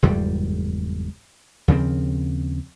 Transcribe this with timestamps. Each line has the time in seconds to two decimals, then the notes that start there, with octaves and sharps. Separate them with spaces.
0.02 F#1 E2 G#2 G3
1.68 D#2 C#3 F3 C4